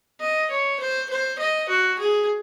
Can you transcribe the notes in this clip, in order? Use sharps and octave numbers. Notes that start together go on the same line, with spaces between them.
D#5
C#5
C5
C5
D#5
F#4
G#4